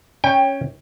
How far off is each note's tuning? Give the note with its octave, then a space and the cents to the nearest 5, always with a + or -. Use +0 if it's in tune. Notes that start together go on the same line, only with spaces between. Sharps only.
C#4 +0 G5 +20